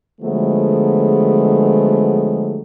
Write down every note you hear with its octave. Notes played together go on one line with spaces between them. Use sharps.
D3 F3 F#3 G#3 A3 B3